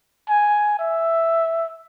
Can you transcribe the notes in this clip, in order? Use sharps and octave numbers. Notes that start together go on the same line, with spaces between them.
G#5
E5